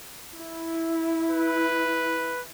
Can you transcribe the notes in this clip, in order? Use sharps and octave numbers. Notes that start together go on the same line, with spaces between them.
E4
B4